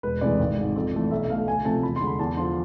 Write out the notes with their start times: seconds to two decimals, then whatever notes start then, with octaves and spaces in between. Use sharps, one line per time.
0.03 E1 B4
0.21 D2 C3 E3 G#3 D5
0.39 G#1
0.57 G#2 G#3
0.76 F2
0.93 E3 A3
1.11 B1 E5
1.30 B2 A3 F5
1.47 D2 G#5
1.65 C3 F3 A3 A5
1.83 E2 B5
1.96 C6
2.01 D3 G#3
2.07 B5
2.19 E2 A5
2.37 D3 F3 C6